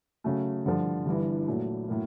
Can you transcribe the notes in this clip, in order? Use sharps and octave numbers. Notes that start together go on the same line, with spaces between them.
C#3 F#3 A3
G2 D3 F3
G1 G2 E3
A#2 F#3 A3
A2 F#3 A#3